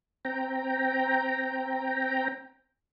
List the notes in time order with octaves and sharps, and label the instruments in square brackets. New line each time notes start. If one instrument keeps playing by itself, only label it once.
[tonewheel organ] C4 G5 A#5